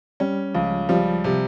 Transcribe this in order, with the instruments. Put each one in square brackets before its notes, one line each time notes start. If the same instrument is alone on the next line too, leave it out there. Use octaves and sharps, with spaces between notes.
[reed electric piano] G3 [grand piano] C#4
[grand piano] C#2 [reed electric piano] F3
[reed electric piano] F3 [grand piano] G3
[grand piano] C3